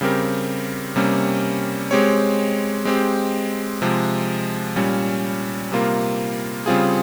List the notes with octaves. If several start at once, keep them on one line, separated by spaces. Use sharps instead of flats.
C#3 G3 C4 G4 A#4
C3 G3 A#3 C#4
G#3 C4 G4 C#5
G#3 C4 G4
C3 F3 G#3
A#2 G3 C#4
C3 G3 A#3 F4 A#4
C#3 G3 C4 F4 G#4